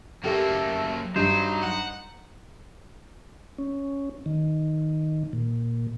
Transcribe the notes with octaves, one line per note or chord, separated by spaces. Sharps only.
F#2 A3 A#3 G4 A4
G2 F#3 D#4 C5
F#5
C#4
D#3
A#2